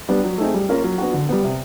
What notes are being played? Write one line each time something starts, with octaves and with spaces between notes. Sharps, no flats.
G3 B3 D4
F#3
A3 C4 D#4 G#4
G3
A#3 C#4 F4 A#4
F#3
B3 D4 F#4
D3
G3 B3
C3